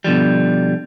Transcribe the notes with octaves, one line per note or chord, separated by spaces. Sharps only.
B2 D3 F3 G3